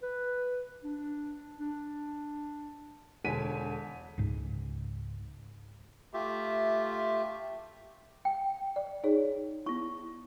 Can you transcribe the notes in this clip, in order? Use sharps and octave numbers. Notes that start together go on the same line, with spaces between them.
B4
D4
D4
E1 D3 G#5 B6 D#7
C#2 G#2
A3 F4 G4 E5
G5
D5
D#4 G#4 C#5
B3 E4 C#6